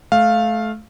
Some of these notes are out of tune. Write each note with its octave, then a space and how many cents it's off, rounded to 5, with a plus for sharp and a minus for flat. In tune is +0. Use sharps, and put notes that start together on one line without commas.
A3 -25 F5 +0